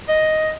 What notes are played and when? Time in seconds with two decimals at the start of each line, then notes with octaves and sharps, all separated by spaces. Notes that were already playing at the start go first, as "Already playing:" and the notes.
0.08 D#5